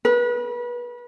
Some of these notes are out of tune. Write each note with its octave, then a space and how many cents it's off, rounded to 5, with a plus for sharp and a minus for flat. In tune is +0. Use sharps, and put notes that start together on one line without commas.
B4 -30